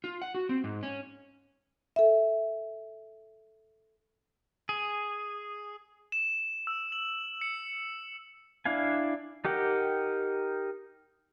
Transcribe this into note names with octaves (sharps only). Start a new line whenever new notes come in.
F4
F#5
F#4
C4
G#2
C#4
A4 E5
G#4
E7
E6
F#7
C#7
D4 E4 F5 G#5
D#4 G4 A#4 F#5 G5